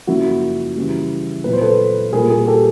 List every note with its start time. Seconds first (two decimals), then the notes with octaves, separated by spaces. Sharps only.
0.07 F#2 C#3 F3 A#3 E4 F#4
0.76 C#3 E3 G3
1.44 A#2 F#3 B3 B4
1.53 C5
1.61 A4 B4
2.13 A#2 G3 A#3 G#4 A#4
2.30 G#4 A#4
2.47 G4 A4